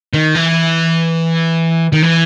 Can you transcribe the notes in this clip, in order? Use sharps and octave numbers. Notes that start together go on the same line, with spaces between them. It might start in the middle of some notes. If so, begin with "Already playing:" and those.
D#3
E3
D#3
E3